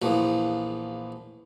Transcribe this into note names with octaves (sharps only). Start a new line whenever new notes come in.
A#1 E2 F3